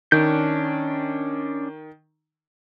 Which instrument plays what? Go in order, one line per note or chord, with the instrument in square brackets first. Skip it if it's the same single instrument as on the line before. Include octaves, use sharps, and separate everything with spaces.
[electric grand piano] D#3 [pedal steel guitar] C#4 D4 G6